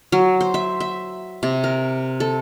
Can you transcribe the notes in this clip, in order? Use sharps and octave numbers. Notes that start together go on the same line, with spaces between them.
F#3
C5
E5
E5
C3
A#4
A4